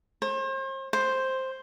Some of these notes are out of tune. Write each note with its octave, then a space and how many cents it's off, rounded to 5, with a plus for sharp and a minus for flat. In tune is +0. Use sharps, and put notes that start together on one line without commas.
C5 +40
C5 +5